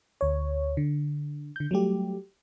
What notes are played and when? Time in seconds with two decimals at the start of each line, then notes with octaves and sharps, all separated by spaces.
0.21 D2 C#5
0.77 D3
1.56 D3 G6
1.71 F#3 G3 A3 G4